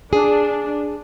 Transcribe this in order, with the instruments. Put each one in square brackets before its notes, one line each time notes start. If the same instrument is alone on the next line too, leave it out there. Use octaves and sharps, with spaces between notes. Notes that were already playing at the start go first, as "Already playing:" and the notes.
[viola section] D4 [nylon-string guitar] G#4